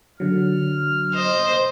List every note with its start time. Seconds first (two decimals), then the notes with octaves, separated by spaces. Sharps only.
0.20 D3 F#3 F6
1.15 C5 D#5